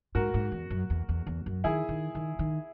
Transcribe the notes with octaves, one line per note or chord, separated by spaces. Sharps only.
G#2 F#4 A#4
G#2
E2
F#2
E2
E2
E2
F#2
D#3 E4 G#4
D#3
D#3
D#3